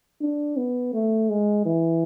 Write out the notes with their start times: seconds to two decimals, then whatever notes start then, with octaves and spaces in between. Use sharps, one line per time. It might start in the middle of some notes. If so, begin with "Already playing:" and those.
0.21 D4
0.57 B3
0.94 A3
1.30 G#3
1.66 E3